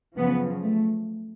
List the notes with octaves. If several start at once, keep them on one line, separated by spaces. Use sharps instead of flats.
F#2 C#3 F3 B3
A3